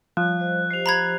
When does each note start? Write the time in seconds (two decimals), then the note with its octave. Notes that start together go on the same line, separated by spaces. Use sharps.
0.17 F3 G3 C#5 F#6
0.39 G3 C5 D#5
0.71 G4 C5 D#5 C7 F7
0.86 A#5 B5 G#6